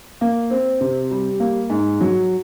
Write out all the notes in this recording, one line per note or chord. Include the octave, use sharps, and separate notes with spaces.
A#3
C4
C3
G3
A#3
G#2
F#3